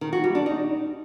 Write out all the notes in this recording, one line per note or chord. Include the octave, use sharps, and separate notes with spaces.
D#3
F#4
G3
D4
D#4